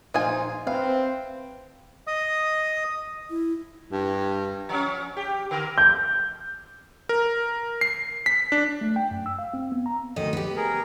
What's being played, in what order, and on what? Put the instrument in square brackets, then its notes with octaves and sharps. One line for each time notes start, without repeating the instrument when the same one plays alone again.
[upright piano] A#1 C5 [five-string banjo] D#4 F4 G#5
[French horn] C4 [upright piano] B4 E5 [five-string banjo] F5
[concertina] D#5 D#6
[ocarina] E4
[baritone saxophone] G2
[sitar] F3 C#4
G4
D3 A#4
[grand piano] G6
[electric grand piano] A#4
C7
B6
D4
[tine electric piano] A3
G5
F#2
E6
F5
C4
B3
A#5
[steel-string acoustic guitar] D2 D#3 D#5
B3 G4
[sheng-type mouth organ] G#4 A#4